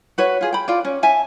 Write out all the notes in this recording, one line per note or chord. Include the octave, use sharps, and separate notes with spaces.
F#4 B4 C#5
F4 G#4
G5 B5
F4 D5
C#4
E5 G#5 A5